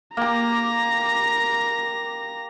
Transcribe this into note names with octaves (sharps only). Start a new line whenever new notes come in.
A#3 G4 A#5 A#6